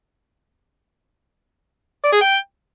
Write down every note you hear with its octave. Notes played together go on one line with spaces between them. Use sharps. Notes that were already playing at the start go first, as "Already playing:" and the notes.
D5
G#4
G5